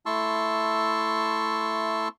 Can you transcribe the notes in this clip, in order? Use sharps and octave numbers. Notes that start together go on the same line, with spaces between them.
A3 E4 A5 C6 C#6 E6